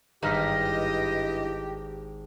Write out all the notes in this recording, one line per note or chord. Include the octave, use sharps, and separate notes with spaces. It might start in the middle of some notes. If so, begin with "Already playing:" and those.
G#1 G2 E3 D#4 G4 D#5 F6 B6